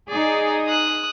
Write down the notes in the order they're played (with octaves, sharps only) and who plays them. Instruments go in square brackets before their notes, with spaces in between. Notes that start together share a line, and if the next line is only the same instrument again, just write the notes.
[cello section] D#4 G#4 [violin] D5
[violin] D#6 F#6